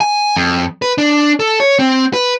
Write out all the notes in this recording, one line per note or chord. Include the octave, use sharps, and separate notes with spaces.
G#5
F2
B4
D4
A4
C#5
C4
B4